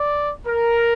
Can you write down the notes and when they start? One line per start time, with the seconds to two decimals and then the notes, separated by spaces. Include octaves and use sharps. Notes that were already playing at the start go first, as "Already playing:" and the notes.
Already playing: D5
0.46 A#4